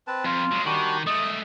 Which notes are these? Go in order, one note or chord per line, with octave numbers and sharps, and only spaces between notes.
C4 B4 A5
F2 F4
F#3 G#3
D#3 G3 D4 F#4
G#3 A3 D#5 D#6